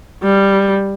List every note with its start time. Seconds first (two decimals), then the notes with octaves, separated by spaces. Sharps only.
0.23 G3